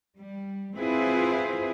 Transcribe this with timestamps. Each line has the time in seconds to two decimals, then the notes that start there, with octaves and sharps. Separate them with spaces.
0.19 G3
0.77 C4 E4 F4 G#4 B4 C5